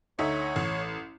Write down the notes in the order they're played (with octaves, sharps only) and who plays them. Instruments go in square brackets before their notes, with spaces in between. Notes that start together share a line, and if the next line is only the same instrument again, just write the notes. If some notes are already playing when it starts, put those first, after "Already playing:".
[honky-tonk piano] D2 D#4 E5 [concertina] C#5
[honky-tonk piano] A1